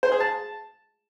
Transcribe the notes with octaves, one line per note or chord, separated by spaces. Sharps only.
C5
G#4
A5